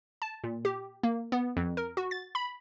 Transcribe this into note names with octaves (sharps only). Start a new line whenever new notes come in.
A5
A#2
G4
A#3
B3
F2
A#4
F#4
A6
B5